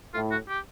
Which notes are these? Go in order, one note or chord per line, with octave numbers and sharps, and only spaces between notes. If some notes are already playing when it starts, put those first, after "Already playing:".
A2 F4
F#4
G4